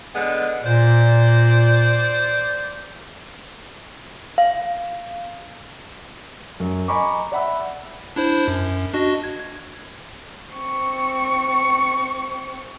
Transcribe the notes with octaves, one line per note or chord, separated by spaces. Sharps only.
D3 G#3 B3
A#2 C5 D5
F5
F#2
D#5 G#5 A#5 B5 C#6 D6
D5 E5 F#5 B5 E6
D4 E4 C5
F#2
D4 F#4 D#5
G#6
C4 C#6